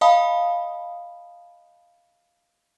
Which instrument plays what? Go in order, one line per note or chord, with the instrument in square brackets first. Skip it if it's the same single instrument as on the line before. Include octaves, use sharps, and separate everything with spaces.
[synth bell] D#5 F5 A5 B5 D#6